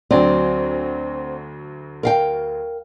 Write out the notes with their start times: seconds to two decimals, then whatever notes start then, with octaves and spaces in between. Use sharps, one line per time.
0.11 D2 F#3 C4 D5
2.03 A#4 F5 G5